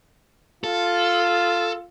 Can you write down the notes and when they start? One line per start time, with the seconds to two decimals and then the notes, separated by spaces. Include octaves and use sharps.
0.64 F4 A4